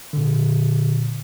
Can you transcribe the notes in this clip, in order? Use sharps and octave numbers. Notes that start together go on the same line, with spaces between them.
A#2 D3